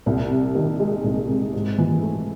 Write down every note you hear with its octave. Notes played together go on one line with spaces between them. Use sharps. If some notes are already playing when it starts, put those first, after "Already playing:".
C2
C3
D#3
G#3
C2
C3
G#2
E3
A3